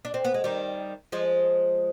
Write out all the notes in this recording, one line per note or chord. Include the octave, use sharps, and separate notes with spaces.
D4
C4
B3
G#3
D#3 G3
F3 G#3